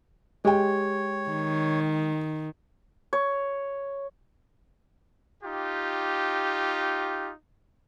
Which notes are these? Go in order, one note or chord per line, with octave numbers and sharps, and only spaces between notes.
G#3 G4 C#5 G5
D#3
C#5
D#4 F4 G4